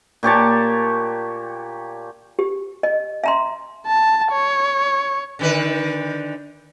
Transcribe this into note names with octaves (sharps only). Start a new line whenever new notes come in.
A#2 G4 C#5 A5
G4
D#5
E5 A#5 C6
A5
C#5
D3 D#3 B4